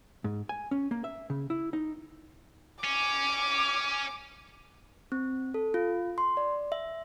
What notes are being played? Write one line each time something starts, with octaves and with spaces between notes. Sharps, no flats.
G#2
G#5
C#4
A#3
E5
C#3
E4
D#4
C#4 D6
C4
A4
F4
C6
D5
E5